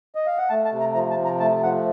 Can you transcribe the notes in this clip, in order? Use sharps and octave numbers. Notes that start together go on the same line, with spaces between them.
D#5
F5
F#5
A3 A5
A5
C3
A#5
F3 A#5
A5
C3
A#5
A3 A5
F3 F#5